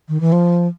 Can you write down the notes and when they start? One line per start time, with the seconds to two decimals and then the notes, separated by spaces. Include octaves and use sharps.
0.08 D#3
0.20 E3
0.32 F3